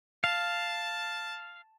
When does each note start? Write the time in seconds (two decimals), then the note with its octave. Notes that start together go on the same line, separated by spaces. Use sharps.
0.24 F5 A5